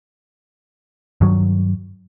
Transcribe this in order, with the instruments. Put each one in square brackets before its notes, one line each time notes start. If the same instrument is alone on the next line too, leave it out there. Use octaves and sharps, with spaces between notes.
[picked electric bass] G2 D#3 F#3